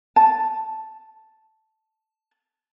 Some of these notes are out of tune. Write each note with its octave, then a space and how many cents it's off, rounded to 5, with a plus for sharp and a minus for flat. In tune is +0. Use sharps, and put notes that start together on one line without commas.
A5 +0